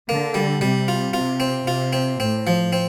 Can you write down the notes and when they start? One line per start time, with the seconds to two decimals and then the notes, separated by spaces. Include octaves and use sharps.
0.09 D3 A#3
0.34 G3
0.61 C3 G3
0.88 F4
1.13 C3 F4
1.40 C4
1.67 C3 F4
1.93 C4
2.20 A2 C4
2.47 F3
2.73 C4